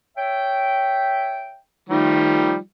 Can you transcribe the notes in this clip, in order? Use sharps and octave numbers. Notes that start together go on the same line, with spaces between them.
C#5 E5 G5
D#3 F3 G3 A3 D#4